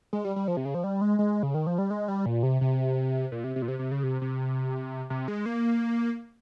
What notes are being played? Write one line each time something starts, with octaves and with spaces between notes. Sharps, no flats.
G#3
G3
G3
F3
C3
C#3
F3
G3
G#3
G#3
C#3
D#3
F3
G3
G#3
G3
A#2
C3
C3
A#2
C3
C3
A#2
C3
C3
C#3
C3
C3
C3
G#3
A#3